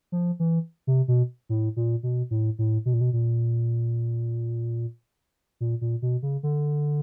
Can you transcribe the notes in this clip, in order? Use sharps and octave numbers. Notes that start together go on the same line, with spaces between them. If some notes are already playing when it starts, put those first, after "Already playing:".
F3
E3
C3
B2
A2
A#2
B2
A2
A2
B2
A#2
B2
A#2
A#2
A#2
B2
C#3
D3